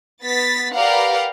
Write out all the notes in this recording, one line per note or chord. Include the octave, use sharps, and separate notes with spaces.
B3 A6 B6
G4 A#4 B4 D5 F5 F#5